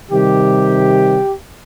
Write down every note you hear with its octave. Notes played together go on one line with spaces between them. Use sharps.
C3 D#3 G3 G4